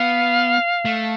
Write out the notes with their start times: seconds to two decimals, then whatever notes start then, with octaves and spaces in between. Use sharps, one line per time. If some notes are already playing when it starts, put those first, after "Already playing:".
Already playing: B3 F5
0.85 A3